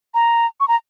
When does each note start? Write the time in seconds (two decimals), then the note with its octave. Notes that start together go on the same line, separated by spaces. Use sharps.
0.14 A#5
0.60 C#6
0.68 A#5